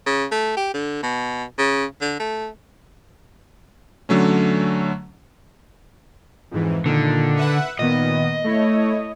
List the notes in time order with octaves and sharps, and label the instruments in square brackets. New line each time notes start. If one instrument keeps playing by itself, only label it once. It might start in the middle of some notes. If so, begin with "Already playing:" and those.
[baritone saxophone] C#3
A3
G4
D3
B2
C#3
D3
A3
[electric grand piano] D3 F#3 A3 C#4
[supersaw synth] F2 G#2 E3
[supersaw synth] A#2 D#3 [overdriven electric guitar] D3
[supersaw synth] B4 E5 F#5
[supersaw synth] A#2 D#3 B3 [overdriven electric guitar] D#5
[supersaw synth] A3 E4 C#5